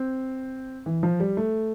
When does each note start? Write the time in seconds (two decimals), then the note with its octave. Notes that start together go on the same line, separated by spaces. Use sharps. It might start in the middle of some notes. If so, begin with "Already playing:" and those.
Already playing: C4
0.86 E3
1.03 F3
1.20 G3
1.37 A3